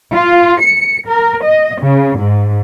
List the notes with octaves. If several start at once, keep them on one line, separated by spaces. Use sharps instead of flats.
F4
C#7
A#4
D#5
C#3
G#2